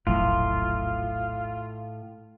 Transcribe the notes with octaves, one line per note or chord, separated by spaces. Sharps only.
E1 A#1 A2 F#3 F4